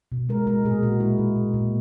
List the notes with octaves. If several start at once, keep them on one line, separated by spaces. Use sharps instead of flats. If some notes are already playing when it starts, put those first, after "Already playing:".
B2
G#3 A#4
G#3 A#4
A#2 G#4
A#2 F#4
G#3 E4
G#3
A#2
A#2